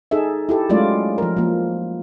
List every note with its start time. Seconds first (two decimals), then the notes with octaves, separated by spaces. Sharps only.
0.11 D#4 G#4 A4 E5
0.49 E4 G4 A4
0.69 F#3 G#3 A3 C#4 F4 D5
1.18 F3 A#4
1.37 F3 A#3